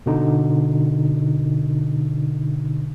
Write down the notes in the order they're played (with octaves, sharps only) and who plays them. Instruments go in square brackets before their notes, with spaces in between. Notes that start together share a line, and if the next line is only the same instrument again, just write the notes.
[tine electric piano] B2 D3 D#4